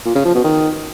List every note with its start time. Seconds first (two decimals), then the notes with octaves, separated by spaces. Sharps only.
0.05 A#2
0.15 C#3
0.25 F3
0.35 B2
0.44 D#3